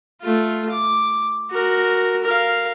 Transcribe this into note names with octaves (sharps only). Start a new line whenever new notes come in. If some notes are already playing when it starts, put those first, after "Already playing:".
A3 F4
D6
F#4 A#4
A#4 F5